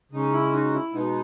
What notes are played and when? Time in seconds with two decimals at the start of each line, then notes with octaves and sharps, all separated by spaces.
0.12 C#3 G#3 C#4 D#4
0.32 E4
0.53 D#4 F#4
0.73 E4
0.93 B2 G#3 B3 D#4